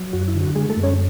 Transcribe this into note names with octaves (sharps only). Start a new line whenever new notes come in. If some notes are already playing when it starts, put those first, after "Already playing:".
Already playing: F#3
F#2 F#4
E4
D3
F#4
G#3 G#4
A3 A4
F#2
C#4 C#5